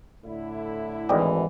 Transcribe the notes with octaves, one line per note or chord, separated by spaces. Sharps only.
A2 D3 E4
G#1 D2 E3 D5 D#5 G5 D6